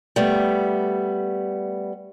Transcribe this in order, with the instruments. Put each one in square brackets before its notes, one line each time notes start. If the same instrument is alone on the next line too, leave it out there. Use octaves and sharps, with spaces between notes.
[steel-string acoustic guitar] G3 A3 B3